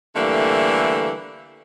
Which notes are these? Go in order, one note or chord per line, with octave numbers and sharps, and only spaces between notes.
D3 E3 G3 A3 A#3